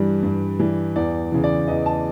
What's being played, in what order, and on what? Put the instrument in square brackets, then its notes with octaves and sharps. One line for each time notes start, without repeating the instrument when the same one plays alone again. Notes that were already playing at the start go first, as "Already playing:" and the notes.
Already playing: [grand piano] G2 E3 G3
G2
E3 G3
E2 D5
C#3 E3
D5
E2 D#5
A5